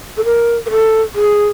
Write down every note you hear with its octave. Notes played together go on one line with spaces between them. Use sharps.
A4
A#4
A#4
A4
G#4